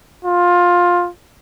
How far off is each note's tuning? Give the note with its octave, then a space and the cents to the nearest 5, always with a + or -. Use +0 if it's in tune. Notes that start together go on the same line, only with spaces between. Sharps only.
F4 +15